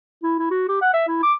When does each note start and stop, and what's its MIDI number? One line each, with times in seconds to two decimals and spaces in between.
0.23 0.36 64
0.39 0.50 64
0.51 0.66 66
0.68 0.81 67
0.82 0.91 78
0.93 1.06 76
1.08 1.21 64
1.23 1.33 86